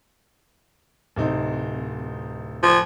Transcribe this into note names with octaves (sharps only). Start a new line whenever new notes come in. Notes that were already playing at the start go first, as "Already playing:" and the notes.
D1 C3 D#4
F3